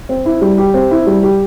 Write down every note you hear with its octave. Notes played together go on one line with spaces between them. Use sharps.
C4
E4
G3
G4
C4
E4
G3
G4